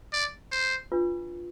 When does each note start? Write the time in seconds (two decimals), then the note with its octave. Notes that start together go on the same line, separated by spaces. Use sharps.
0.13 D5
0.52 C5
0.92 D4 F4 B4